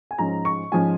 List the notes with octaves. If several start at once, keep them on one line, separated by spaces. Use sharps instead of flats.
G#5
G#2 F3 C#4 A#5
C#6
G#2 F3 C#4 G#5